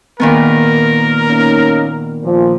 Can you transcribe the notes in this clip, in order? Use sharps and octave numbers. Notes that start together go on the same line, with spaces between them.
A#2 D#3 B3 A#4
A#3 C#4 D#4
A#2 F3